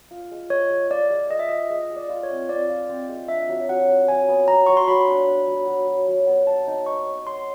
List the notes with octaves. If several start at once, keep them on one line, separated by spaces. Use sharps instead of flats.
F4
G#3
G#3 C#5
G#3
F4 D5
G#3
G#3 D#5
E5
G#3 D#5
G#3 D#5
G#3
D5
F4
C#5
C4
C4 D5
F4
C4
G#3
D4 E5
F#3
F#3 F#5
F#3
F#3 G#5
B3
F#3 A#5
F#3 C#6
C6
F#3 B5
D4
D4
F#3
F#3
F#3
F#3
B3
C#5 A5
D#4
D#4 C#6
C#5
C#5 C6